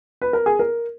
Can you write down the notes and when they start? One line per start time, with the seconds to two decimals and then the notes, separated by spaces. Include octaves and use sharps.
0.22 B4
0.33 A#4
0.46 G#4
0.59 A#4